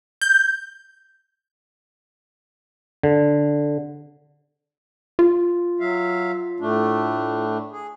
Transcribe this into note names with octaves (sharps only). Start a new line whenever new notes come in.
G6
D3
F4
F#3 E5 F5
A2 A3 D4
G#4